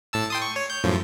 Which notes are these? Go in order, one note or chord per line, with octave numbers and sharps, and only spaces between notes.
A2 A5 E6
G5 C6 D#6
C#6
C#5
G6
F#2 A2 F3